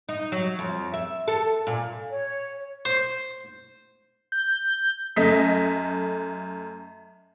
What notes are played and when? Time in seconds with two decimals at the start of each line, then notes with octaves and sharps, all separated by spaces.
0.09 D#4
0.32 F#3
0.59 F2
0.94 E5
1.28 A4
1.67 A#2
2.10 C#5
2.85 C5
4.32 G6
5.16 F#2 A3 D#5 B6